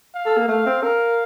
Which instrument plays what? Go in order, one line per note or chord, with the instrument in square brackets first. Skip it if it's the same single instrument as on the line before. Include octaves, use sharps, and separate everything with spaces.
[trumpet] F5
[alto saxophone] A4
A#3
[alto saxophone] A3 [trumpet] F5
[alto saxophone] C4
[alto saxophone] A#4 [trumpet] F5